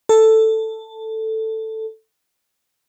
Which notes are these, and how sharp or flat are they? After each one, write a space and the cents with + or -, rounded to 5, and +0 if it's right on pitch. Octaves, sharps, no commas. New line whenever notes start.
A4 +5